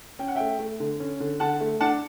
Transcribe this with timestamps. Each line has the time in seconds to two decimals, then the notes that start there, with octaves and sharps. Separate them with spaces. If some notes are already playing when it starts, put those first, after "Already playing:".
0.19 C#4 G5
0.28 F#5
0.35 A3 E5 G5
0.59 A3
0.80 D3
1.00 C#4
1.20 D3
1.40 D3 F#5 A5
1.60 A3
1.80 D4 F#5 A5